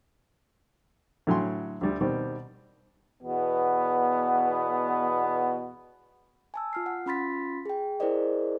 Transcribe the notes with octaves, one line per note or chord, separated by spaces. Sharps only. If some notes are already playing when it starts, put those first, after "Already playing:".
A2 D3 F#3 G5 G#5 C6
D2 G3
B2 D#3 G3 C4
E2 B2 B3
G#5 A5 E6
F4 F6 C7
F#5
C#4 F4 B5 C6 A6 B6
G#4 G5
E4 G#4 A#4 C5 D5 D#5